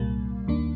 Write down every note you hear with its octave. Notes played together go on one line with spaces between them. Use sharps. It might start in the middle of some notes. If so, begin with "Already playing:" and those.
Already playing: C2 A#2 G3 A#3
D#2 D#3 A#3 D4